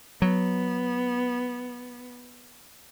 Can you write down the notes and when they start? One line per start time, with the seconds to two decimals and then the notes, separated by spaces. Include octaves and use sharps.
0.22 F#3 B3